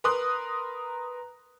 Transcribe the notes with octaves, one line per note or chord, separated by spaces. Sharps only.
A#4 B4 A#5 C6 D#6 F#6